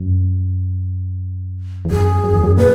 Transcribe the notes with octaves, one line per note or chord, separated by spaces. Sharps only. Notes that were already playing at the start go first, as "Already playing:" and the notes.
Already playing: F#2
E2
F#2 G#4
F#2
E2
F#2
A#2 B4